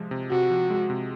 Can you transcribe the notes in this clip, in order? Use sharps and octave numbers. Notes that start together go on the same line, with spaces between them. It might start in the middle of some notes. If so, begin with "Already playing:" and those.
Already playing: C3 F3 G#3
C3
C3 F#4
F3
G#3
C3